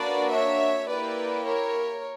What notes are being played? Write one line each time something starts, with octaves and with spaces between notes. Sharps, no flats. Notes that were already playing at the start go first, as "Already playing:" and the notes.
Already playing: A#3 D4 F#4 B4 D5
C#5 E5
A#3 E4 G4 B4 D5
A#4 C#5